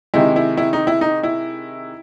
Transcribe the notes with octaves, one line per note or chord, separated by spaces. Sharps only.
C3 D#3 G#3 E4
E4
E4
D#4
E4
D#4
E4